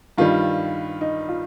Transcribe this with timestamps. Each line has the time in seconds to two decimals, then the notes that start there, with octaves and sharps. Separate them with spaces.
0.18 G2 D#3 G3 F4
1.01 D#4
1.29 F4